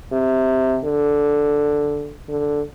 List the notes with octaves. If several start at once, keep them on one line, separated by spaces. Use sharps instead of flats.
C3
D3
D3